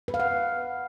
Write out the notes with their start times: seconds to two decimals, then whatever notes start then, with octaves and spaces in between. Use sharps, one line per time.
0.08 B4
0.14 F5
0.20 F#5